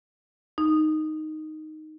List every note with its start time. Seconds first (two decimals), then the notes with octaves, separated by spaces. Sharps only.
0.58 D#4